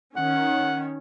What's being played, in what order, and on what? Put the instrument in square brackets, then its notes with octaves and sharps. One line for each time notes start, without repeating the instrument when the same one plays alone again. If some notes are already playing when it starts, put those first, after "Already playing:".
[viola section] D#3 C#4 [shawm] F#5